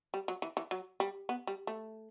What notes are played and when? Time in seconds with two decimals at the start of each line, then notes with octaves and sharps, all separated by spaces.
0.14 G3
0.28 F#3
0.42 E3
0.57 E3
0.71 F#3
1.00 G3
1.29 B3
1.47 G3
1.67 A3